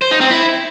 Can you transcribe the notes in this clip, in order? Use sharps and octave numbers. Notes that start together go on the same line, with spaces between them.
C5
D#4
C4
E4